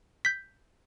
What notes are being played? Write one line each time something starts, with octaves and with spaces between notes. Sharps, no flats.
G6 B6